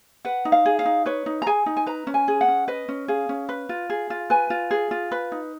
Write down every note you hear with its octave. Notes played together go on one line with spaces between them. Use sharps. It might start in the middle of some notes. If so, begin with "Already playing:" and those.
B4 F#5
D#4
F5
G#4
F5
D#4
B4 C#5
D#4
A#5
G#4 G#5
D#4
G#5
B4 A#5
C#4
G#5
G#4
F#5
C#4
B4 D#5
C#4
G#4 F5
C#4
B4
F4
G#4
F4
B4 G#5
F4
G#4
F4
B4
D#4